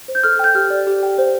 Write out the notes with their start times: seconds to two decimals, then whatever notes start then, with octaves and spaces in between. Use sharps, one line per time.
0.08 C5
0.15 G6
0.23 A4 F6
0.39 G5 G6
0.55 G4 F6
0.70 D5
0.87 G4
1.03 G5
1.18 C5